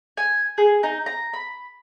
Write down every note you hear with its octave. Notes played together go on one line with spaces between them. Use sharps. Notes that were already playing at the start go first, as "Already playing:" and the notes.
G#5
G#4
D#4
A#5
B5